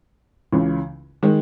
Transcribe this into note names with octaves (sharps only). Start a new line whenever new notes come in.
C#2 C#3 E3
D#3 G#3